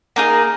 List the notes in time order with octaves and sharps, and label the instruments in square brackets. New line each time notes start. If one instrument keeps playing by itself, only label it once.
[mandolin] A#3 D#4 G#4